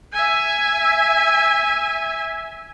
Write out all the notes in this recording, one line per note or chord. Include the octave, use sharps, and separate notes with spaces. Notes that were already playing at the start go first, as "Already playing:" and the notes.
E5 G#5